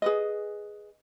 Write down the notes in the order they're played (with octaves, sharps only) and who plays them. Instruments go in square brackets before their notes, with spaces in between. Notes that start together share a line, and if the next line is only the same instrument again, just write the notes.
[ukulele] G#4 B4 D#5